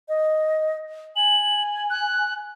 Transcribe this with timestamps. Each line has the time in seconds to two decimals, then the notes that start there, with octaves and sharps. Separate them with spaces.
0.09 D#5
1.16 G#5 F#7
1.90 F#6